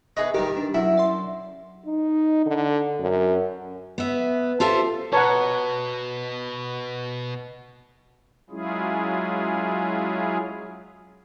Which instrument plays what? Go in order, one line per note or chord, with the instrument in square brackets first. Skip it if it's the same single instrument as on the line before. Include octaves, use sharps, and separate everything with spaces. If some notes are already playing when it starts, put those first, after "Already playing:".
[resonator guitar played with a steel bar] B3 G#4 B4 [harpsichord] D#5 [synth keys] E5 C#6
[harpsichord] G2 D#3 [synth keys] G4 [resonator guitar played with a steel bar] A#4
[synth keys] D4
[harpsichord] F#2 [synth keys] E4 [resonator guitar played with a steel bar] E5
[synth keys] D5 C6
[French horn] D#4
D3
F#2
[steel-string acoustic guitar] B3 E5
F4 G4 A4 C5 E5 F5
[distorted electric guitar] B2 [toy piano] B4 A#5 [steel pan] C#5 F#5 [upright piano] A5
[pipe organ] F#3 G#3 C#4 E4 F4 G#4